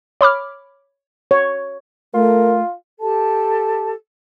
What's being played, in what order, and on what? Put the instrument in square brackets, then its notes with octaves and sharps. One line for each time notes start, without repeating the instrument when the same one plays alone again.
[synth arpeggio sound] C#5 B5 D6 F6
[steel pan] C#5
[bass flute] A3 [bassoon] F4 [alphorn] A#4
[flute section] G4 A4 A5